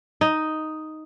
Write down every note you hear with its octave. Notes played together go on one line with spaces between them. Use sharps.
D#4